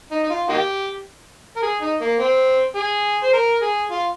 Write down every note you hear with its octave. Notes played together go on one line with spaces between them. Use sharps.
D#4
D#4
F4
A#3 D#4 G4
A#4
G#4
D#4
A#3
C4
G#4
C5
A#4
G#4
F4